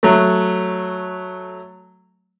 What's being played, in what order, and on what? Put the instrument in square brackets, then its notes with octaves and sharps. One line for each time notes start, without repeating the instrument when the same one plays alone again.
[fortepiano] F#3 A3